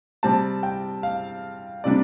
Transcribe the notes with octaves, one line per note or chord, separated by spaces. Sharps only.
C3 G3 C4 A5
G5
F5
C3 G3 D4 D5